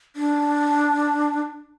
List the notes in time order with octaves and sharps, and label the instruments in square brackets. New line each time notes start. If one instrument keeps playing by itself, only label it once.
[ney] D4